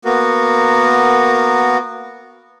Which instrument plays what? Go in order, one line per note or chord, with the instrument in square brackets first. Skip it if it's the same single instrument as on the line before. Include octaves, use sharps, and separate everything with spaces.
[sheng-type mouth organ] A#3 B3 F#4 A#4